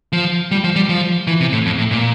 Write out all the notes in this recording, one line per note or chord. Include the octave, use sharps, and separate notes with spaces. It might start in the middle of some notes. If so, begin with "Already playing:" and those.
F3
G3
F3
G3
F3
E3
C3
A2
F2
A2
A#2